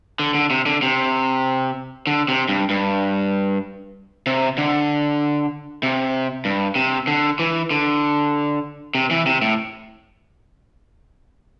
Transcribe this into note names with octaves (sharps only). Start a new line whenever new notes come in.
D3
D3
C3
D3
C3
D3
C3
G2
G2
C3
D3
C3
G2
C3
D3
E3
D3
C3
E3
C3
A2